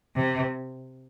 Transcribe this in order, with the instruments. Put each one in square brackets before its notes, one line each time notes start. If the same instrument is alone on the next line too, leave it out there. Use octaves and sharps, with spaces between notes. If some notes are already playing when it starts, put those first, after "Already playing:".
[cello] C3